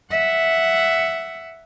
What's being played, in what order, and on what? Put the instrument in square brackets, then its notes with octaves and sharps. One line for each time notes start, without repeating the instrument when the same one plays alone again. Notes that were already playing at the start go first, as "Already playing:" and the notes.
[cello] E5 F#5